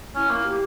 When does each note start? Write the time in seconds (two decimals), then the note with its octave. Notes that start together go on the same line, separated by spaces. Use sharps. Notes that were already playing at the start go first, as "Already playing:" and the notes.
0.15 C#4 E4
0.30 A#3
0.44 G4